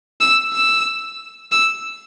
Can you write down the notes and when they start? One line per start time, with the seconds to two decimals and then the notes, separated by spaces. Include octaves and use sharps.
0.21 E6
0.53 E6
1.52 E6